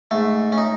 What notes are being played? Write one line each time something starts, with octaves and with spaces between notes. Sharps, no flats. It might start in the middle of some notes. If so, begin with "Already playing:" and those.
G#2 A3
C#4
D#4